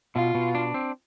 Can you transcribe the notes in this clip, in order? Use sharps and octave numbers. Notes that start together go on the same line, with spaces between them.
B2 F4
B2
D4
C4